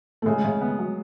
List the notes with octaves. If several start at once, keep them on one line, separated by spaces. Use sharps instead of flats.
A3
C#3 G#3
C#3
B3
F#3